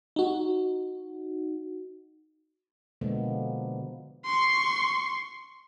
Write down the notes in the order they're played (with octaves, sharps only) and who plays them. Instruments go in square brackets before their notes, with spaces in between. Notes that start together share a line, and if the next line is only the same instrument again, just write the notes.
[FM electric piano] D#4 F#4
[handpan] B2 D3 F3 G#3 A#3 B3
[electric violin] C6 C#6